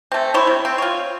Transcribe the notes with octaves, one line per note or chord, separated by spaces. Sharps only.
A3 C4
E4 C5 C#5
C3
C4
F4 C#5